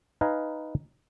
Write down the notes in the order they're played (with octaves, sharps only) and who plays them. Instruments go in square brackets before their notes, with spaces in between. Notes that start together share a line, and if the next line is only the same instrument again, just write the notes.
[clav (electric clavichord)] D#4 B4 F5 G#5 A#5